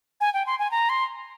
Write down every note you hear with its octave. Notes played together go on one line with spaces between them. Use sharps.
G#5
G5
C6
G#5
A#5
C6